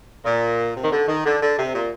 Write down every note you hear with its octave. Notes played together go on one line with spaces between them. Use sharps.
A#2
C3
D#3
D3
D#3
D3
D3
C3
A#2